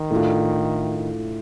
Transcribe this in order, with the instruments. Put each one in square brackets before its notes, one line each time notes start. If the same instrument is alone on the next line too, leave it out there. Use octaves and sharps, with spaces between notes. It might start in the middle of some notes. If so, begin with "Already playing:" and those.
Already playing: [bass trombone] D#3
[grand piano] A2 A3 D4 F4